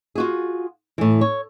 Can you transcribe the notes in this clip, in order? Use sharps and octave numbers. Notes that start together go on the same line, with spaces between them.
F4 F#4 G#4
A2 E3
C#5